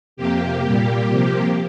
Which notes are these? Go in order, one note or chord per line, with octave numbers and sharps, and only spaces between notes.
F2 C3 A#3 G4
A#2 G3 A#3
C3 F3 A#3